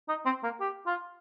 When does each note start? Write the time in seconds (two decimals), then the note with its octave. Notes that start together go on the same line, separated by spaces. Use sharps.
0.09 D#4
0.25 C4
0.44 A#3
0.60 G4
0.86 F4